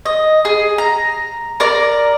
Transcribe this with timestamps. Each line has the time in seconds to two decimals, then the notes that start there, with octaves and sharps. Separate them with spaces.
0.05 D#5
0.45 G#4
0.78 A#5
1.60 A#4 D5 A#5